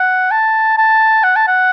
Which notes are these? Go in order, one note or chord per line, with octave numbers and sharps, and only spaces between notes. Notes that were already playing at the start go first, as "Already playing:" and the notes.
Already playing: F#5
A5
A5
F#5
A5
F#5